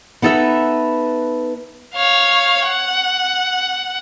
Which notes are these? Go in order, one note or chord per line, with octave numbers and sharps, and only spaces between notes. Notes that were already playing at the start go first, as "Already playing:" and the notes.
B3 D#4 A4 B4 E5
C#5 F5
F#5